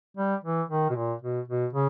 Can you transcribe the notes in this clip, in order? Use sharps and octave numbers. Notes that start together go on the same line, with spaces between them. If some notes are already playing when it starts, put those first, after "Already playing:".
G3
E3
D#3
B2
A#2
B2
B2
C#3